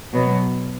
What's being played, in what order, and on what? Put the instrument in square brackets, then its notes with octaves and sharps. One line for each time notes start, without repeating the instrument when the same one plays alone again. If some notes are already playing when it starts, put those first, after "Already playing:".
[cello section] B2 F#3 B3